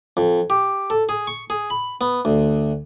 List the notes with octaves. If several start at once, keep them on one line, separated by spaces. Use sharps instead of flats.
F2
G4
A4
G#4
C#6
G#4
B5
B3
D2